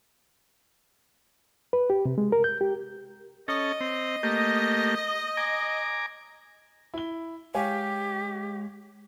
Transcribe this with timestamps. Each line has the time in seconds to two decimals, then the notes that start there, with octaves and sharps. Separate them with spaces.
1.73 B4
1.90 G4
2.06 C3
2.18 G#3
2.32 A#4
2.44 G6
2.61 G4
3.48 C#4 A4 D#5
3.81 C4
4.23 A3 A#3 G4
5.37 G#5 A#5 D6
6.94 E4 G7
7.55 G#3 G4 C#5 F5 G#5